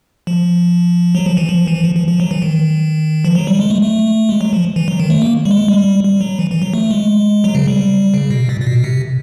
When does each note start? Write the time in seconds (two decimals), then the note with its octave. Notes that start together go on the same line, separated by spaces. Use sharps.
0.27 F3
1.15 F#3
1.26 F3
1.37 E3
1.49 F3
1.68 E3
1.84 F3
1.96 F3
2.08 F3
2.20 F#3
2.31 E3
2.42 D#3
3.25 F3
3.35 F#3
3.47 G3
3.60 G#3
3.70 A3
3.82 A3
4.29 G#3
4.41 F#3
4.53 F3
4.76 E3
4.88 F#3
5.00 D#3
5.10 A3
5.22 A#3
5.45 G3
5.51 G#3
5.68 G3
6.04 G3
6.21 F#3
6.39 E3
6.51 E3
6.62 F#3
6.74 A3
6.91 G#3
7.44 F#3
7.55 C#3
7.68 G3
8.14 C#3
8.30 B2
8.49 A#2
8.61 A#2
8.67 B2
8.84 C3